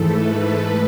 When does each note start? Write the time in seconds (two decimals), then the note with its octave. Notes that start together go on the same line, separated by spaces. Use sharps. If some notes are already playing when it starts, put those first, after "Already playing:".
Already playing: G#2 E3 A3 A4
0.08 B4